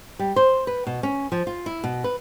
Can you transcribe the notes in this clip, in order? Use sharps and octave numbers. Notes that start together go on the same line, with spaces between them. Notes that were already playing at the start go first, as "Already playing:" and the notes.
G3
C5
B4
B2
C#4
F3
F4
E4
B2
B4